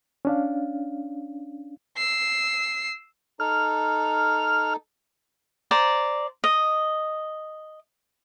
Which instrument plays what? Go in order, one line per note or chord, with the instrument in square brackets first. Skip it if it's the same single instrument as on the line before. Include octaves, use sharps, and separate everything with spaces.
[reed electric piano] C#4 D4 F5
[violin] E6 C7
[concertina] D#4 A4 [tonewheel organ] F6
[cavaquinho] C5 D5 A#5
D#5